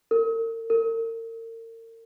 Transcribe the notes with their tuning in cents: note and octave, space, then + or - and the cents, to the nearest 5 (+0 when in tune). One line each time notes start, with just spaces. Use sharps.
A#4 -40
A#4 -40